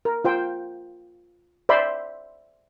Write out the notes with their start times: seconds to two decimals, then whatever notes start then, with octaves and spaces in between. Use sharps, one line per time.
0.05 A#4
0.25 F4 C5 G5
1.69 C5 D5 E5 B5 C6